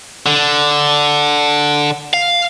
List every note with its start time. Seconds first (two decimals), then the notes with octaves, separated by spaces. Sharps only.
0.26 D3
2.14 F5